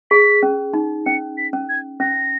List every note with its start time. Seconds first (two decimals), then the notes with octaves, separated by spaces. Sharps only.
0.11 G#4 B6
0.43 C#4
0.74 D#4
1.06 C#4 C#7
1.38 B6
1.53 C#4
1.69 G#6
2.00 C#4 A#6